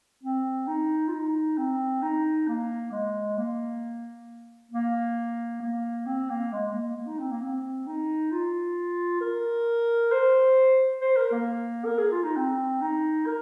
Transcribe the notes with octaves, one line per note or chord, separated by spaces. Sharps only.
C4
D#4
F4
D#4
C4
D#4
A#3
G#3
A#3
A#3
A#3
C4
A#3
G#3
A#3
A#3
D#4
C4
A#3
C4
D#4
F4
A#4
C5
C5
A#4
A#3
A#4
G#4
F4
D#4
C4
D#4
A#4